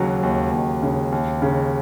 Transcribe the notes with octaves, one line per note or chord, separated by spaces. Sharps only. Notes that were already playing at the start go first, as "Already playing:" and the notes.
Already playing: D#2 C#3 F#3
D#2
D#2
C#3
D#2
C#3